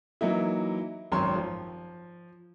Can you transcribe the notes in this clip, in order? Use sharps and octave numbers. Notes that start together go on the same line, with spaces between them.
E3 F#3 A#3 D#4 E4
G#1 F#2 C#5 A#5 C6
F3